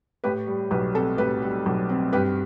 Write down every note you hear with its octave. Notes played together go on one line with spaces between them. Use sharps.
A2 G4 B4
G3
B1 G4 B4
C4 A4
A2 G4 B4
G3
B1
C4
G2 G4 B4